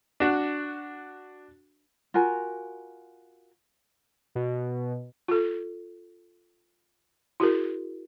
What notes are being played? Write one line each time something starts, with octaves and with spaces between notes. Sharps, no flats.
D4 F#4
F4 F#4 A#4 G#5
B2
F4 A4
E4 F#4 G#4 A#4